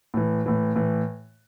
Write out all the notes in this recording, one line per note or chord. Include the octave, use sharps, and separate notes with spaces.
A2 E3
A2 E3
A2 E3